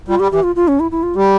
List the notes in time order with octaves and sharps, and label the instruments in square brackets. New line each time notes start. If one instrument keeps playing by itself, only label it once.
[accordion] G3 [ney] F4
[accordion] G3 [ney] G4
[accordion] E3 [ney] G4
[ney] F4
F4
C#4
E4
E4
F4
[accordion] G3 [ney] G4